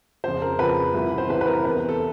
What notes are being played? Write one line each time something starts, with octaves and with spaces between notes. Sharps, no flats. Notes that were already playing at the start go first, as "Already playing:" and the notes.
F2 C#3 F3 C5
A#4
F2 C#3 F3 B4
C2 C3 E3
C5
C2 C3 E3 B4
B4
A#4
E2 C3 E3 B4
A4